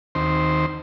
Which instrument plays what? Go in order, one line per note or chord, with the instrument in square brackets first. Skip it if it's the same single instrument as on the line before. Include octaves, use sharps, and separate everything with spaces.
[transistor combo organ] D#2 D#3 C4 C5